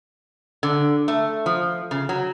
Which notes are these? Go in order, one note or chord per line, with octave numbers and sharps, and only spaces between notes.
D3
A3
F3
C#3
F#3